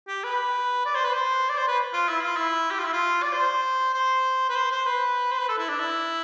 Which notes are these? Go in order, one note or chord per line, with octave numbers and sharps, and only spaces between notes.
G4
B4
D5
C5
B4
C5
D5
C5
B4
F4
E4
F4
E4
G4
F4
E4
F4
D5
C5
C5
B4
C5
C5
B4
C5
B4
A4
E4
D4
E4